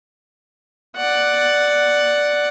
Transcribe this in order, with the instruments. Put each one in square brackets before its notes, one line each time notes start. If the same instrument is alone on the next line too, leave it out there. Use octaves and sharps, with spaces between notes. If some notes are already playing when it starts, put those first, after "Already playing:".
[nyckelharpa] D5 F#5